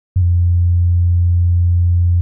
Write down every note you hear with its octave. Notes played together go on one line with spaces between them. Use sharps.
F#2
F2